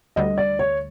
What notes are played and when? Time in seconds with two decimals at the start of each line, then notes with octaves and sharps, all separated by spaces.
0.16 D2 D3 G3 D#5
0.38 D5
0.59 C#5